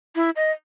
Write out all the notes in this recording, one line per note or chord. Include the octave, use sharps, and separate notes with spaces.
E4
D#5